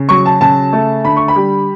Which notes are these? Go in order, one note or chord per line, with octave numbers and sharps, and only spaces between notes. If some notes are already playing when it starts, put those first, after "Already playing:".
Already playing: C#3
F#3 C#6
A5
C#3 A5
A3
D3 B5
C#6
B5
G3